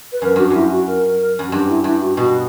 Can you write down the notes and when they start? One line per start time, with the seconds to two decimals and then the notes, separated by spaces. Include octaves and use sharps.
0.12 B4
0.22 F#2 A#4
0.36 G2 F#4
0.47 F#4
0.50 F#2 E4
0.71 F#4
0.87 A#4
1.39 F#2
1.48 F#4
1.52 G2 G4
1.68 E4
1.84 G2 E4
2.01 F#4
2.17 B2 F#4